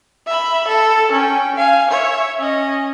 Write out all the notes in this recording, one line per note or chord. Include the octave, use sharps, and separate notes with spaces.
E5 B5
A4
C#4 G5
F5 G#5
C#5 E5
C#4 D#5